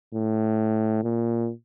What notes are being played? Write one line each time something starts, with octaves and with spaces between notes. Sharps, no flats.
A2
A#2